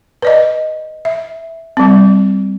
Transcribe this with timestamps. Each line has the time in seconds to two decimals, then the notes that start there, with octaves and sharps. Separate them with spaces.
0.22 B4 D5 D#5
1.05 E5
1.77 G3 C4